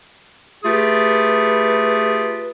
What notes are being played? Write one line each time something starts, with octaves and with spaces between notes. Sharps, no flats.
A3 F4 G4 G#4 B4